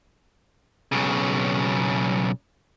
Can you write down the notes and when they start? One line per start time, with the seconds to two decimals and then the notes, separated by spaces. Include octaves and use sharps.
0.92 B1 C#3